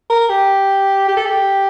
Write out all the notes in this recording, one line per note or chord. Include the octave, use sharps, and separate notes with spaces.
A#4
G4
G4
A4
G4